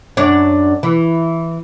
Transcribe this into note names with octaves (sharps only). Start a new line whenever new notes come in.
F#2 D4 C#5
E3